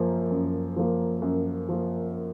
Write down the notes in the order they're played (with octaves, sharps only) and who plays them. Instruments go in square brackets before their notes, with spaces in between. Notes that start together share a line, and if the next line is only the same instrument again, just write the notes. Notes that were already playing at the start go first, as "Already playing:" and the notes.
Already playing: [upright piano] F#2 F3 A#3
F#2
F3 A#3
F#2
F3 A#3